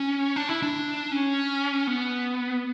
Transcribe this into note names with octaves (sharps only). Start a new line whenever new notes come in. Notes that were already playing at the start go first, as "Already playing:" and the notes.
Already playing: C#4
D4
E4
D4
C#4
B3